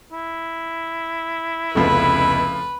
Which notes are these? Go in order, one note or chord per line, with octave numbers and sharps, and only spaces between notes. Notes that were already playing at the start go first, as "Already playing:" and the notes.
E4
F1 C#2 C#3 F3 A3 B3 B4